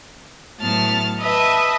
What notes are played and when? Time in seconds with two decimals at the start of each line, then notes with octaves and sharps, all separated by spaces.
0.60 A2 F#3 B3 A5 F6 A6
1.19 B4 D#5 E5 A5 D#6